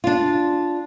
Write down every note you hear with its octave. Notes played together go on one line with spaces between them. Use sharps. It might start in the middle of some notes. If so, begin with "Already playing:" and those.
D4 F4